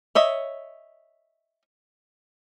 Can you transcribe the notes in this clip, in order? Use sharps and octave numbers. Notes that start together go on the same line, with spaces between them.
C#5 D#5 E5